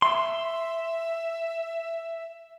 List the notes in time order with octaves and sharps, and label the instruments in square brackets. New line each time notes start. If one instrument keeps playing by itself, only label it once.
[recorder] E5 [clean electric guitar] C6